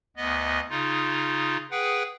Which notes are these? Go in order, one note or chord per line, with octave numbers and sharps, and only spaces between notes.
D2 B3 D#5
C#3 D#4 F4
G#4 B4 F#5 G5